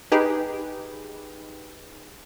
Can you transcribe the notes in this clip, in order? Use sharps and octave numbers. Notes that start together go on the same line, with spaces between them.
D#4 G4 G#4 B4